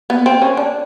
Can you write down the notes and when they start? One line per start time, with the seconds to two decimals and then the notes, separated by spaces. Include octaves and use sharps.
0.10 B3
0.26 C4
0.42 C#4
0.57 D4